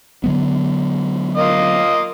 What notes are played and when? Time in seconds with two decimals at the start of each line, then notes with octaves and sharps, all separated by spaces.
0.24 D3 F#3 B3
1.37 A#3 F4 D#5